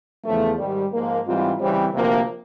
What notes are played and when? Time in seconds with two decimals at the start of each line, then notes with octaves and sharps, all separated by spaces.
0.24 E2 C#3 F3 A3
0.58 G#2 D#3 G3
0.93 G#2 F3 A#3
1.26 G#2 E3 G3 C4 F4
1.60 C#3 E3 G3 C4
1.94 D2 C3 F3 A#3